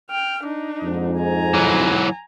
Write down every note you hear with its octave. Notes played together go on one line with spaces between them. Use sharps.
G5 F6
D4 D#4
F2 G#2
G#5 A#5
E3 F#3